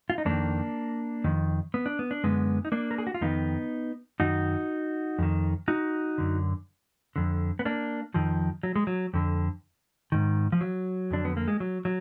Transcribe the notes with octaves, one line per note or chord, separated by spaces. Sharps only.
F4
D#4
F2 D#3 A#3 D4
F2 D#3
B3
D4
B3
D4
F#2 D3 G#3 B3
D#4
A#3 D4
A#4
G#4
F#4
F4
F2 D#3 B3 D#4
F#2 D#3 D#4 F#4
F2 D#3
D#4 F#4
F#2 D3
F2 D3
B3
A#3 D4
F2 D#3 F3
F#3
G#3
F#3
F2 D3
G#2 D#3
F3
F#3
F2 D3 D4
B3
A#3
G#3
F#3
F#3